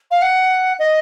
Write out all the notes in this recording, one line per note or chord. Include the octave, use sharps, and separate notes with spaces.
F5
F#5
D#5